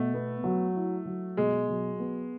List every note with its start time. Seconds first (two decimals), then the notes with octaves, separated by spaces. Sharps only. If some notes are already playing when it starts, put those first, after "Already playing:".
Already playing: B2 A3
0.14 B3
0.44 F#3
0.75 E4
1.06 F#3
1.37 B2 G#3
1.68 F#3
2.00 B3